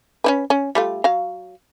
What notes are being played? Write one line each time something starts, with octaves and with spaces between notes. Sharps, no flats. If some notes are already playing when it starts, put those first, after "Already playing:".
C#4 E4 B4
C#4
G3 A3 F4
F#3 F5